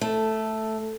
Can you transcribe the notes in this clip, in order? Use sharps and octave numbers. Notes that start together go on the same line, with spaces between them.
A3